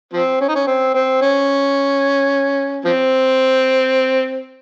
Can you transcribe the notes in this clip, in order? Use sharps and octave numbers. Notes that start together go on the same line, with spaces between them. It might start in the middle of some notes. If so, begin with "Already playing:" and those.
F3 C4
C#4
D#4
C#4
C4
C4
C#4
F3 C4